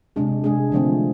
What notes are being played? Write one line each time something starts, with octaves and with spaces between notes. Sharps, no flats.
C3 G#3 D4 G#4
C3 G#3 D4 G#4
D3 F3 A3 C4